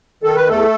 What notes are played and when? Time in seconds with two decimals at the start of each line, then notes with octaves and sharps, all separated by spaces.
0.23 D#3 A4
0.36 B4
0.47 E2 A3 A4